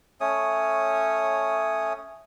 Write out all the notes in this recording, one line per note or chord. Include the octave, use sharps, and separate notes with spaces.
A3 C#4 C#5 D#6